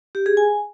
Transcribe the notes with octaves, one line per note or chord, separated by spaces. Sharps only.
G4
G#4
G#5